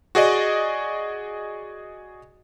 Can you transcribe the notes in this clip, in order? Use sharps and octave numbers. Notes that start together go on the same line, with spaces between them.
F#4 G#4 D5 D#5